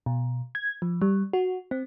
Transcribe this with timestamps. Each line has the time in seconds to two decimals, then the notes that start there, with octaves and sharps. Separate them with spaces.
0.06 B2
0.55 G#6
0.82 F3
1.02 G3
1.33 F#4
1.71 C4